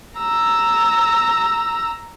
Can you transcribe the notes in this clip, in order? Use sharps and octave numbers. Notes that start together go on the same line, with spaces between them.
A#5 E6